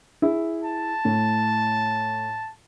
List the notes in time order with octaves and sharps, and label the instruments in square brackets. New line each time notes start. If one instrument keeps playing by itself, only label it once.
[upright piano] E4 G#4
[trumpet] A5
[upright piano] A2